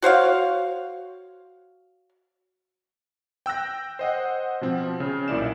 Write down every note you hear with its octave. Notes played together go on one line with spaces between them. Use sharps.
F#4 C5 C#5 F5
G5 E6 F#6 A#6
C5 D#5 F#5
B2 F3 C4
C#3
B1 A#2 E4 D5 E7